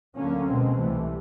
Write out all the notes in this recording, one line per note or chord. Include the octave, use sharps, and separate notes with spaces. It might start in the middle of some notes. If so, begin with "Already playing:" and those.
D2 D3 F#3 A#3 C#4
B2 G#3 C4
C2 C3 E3 A3